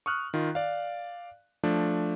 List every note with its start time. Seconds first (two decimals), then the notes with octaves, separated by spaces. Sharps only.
0.06 C#6 D#6 F6 F#6
0.34 D#3 F4
0.55 D5 F5
1.63 F3 A3 D4